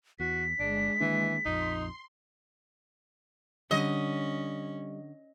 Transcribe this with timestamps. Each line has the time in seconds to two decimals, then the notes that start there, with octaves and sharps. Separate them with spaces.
0.20 E2 F#4 B6
0.59 G1 G#3 D4
1.01 D#3 E3 A#3 D4
1.45 A#1 F2 D#4 C6
3.71 D3 G3 C#4 D#5